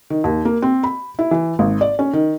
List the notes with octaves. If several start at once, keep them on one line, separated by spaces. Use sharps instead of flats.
D#3
D#2
A#3
C4
B5
E4
E3
G#1
D5
C#4
D#3